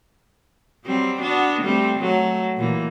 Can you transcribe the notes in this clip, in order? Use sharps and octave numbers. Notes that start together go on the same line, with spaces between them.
F#3 G3 C4
B3 D4 F#4
G3 A3 C4
F#3 A3
A#2 E3